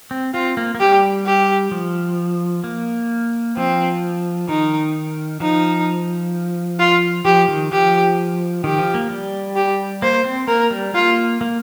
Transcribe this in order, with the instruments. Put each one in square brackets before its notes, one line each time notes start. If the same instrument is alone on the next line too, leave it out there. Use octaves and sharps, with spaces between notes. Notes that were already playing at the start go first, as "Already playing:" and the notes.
[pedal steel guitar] C4
[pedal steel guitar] C4 [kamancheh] F4
[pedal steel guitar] A#3
A#3
[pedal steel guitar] G3 [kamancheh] G4
[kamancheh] G4
[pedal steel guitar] F3
A#3
[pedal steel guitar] F3 [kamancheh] C4
[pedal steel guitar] D#3 [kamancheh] D#4
[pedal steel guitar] F3 [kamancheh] D#4
[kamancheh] F4
[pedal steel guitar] F3 [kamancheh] G4
[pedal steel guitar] D#3
[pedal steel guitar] F3 [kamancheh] G4
[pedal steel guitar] D#3 [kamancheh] G4
[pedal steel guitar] F3
A#3
G3
[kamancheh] G4
[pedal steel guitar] A#3 [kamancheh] C5
[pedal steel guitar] C4
[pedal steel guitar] A#3 [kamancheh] A#4
[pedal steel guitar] G3
[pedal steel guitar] A#3 [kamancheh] F4
[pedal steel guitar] A#3